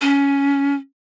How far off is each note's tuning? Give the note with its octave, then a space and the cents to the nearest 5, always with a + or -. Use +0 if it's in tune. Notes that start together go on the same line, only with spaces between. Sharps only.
C#4 +15